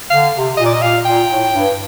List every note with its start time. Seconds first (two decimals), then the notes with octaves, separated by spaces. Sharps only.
0.10 D3 F5
0.34 C3
0.57 A#2 D#5
0.66 D5
0.74 D#5
0.81 A#2 F5
1.05 A#2 G5
1.28 A2
1.52 G2